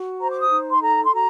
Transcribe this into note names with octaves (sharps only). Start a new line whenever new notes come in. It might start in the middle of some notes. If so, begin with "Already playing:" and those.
Already playing: F#4
C5 A#5
D6
D#6
D#4
C6
A4 A#5
C6
F#4 A#5